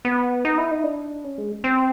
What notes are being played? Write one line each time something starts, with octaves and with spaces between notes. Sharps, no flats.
B3
D#4
E4
D#4
D4
C#4
G#3
C4